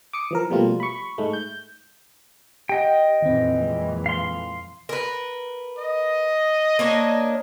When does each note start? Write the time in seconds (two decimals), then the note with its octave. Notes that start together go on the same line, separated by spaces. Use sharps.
0.13 D6 D#6 C#7
0.31 E3 F3 A#4
0.50 B2 F3 G3 A3 A#3 F4
0.80 B5 C#6
1.18 G#2 G#3 A3
1.33 G6
2.69 G4 D#5 F#5 G5
3.22 F2 A#2 D#3 E3 C4
3.63 G#3
4.06 F5 C6
4.89 A#4 B4
5.78 D#5
6.79 A#3 D4 C#5